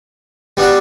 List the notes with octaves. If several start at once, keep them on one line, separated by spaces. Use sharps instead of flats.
G3 B3 D4 F#4